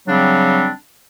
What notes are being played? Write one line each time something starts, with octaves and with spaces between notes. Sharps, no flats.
C#3 F#3 G3 C4 D4